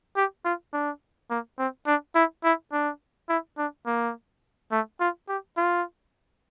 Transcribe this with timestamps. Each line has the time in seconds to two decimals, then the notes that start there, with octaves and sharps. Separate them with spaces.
0.17 G4
0.45 F4
0.73 D4
1.30 A#3
1.59 C4
1.87 D4
2.15 E4
2.44 E4
2.73 D4
3.29 E4
3.58 D4
3.86 A#3
4.72 A3
5.00 F4
5.29 G4
5.57 F4